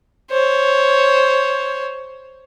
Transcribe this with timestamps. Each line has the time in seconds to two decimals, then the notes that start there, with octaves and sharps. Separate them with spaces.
0.31 C5 C#5